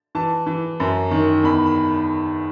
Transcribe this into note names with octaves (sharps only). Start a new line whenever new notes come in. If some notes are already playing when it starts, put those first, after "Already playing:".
E3 A5
E3
F#2
D#3
E2 B5
B5